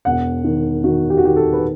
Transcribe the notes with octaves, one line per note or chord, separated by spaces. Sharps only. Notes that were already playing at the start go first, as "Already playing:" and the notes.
E1 F#5
D#3
D#3 F#4
G4
F#4
D#3 G4
A4
B4